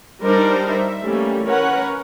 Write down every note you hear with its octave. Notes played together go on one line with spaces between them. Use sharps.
G3 D4 D#4 A#4 C5 D5
E5
E3 G3 A3 A#3 C#4
C#4 A#4 B4 C#5 F#5